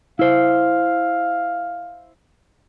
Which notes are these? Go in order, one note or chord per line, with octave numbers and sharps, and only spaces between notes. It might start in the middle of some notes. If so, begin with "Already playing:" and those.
E4 C5 F5